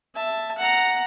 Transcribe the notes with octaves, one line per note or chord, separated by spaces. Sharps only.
E5 A5
F#5 A#5